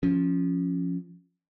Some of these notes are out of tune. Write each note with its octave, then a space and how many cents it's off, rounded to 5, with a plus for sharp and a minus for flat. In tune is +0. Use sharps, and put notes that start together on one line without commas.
F3 +0 C#4 +0